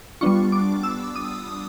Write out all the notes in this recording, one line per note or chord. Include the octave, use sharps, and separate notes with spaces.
G3 B3 D4 F4 C#6
D6
E6
D#6